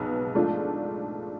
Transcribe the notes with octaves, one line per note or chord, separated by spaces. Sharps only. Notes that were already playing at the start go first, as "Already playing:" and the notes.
Already playing: B1 B2 G#3 B3
G#2 F3 A3 D4 F4